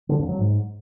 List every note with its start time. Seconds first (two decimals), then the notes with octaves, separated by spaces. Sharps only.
0.09 D3
0.19 F2
0.29 F#3
0.39 G#2